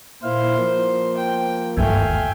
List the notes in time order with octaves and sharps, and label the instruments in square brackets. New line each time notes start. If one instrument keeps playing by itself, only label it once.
[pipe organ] A#2 E4 F5 [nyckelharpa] C5
[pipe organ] F3 A#3
[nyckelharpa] G5
[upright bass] G1 D#2 [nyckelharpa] A3 F5 [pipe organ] E5 G5 G#5